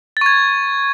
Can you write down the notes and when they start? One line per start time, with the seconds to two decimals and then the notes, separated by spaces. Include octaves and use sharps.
0.17 A6
0.21 C#6
0.26 G#6